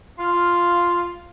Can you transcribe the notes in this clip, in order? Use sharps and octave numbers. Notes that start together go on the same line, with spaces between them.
F4 F5